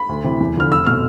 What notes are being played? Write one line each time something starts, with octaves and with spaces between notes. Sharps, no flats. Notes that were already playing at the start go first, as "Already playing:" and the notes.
Already playing: B5
D2
C3 E3
E2
D3 F3 F6
F1 E6
B2 A3 F6